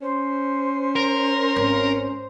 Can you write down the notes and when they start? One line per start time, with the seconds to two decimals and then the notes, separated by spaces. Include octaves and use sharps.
0.02 C#4 C5
0.96 A#4
1.56 G#1